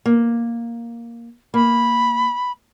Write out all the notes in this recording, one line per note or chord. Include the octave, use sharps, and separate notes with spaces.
A#3
A#3 B5